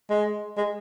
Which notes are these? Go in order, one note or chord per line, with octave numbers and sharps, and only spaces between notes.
G#3
G#3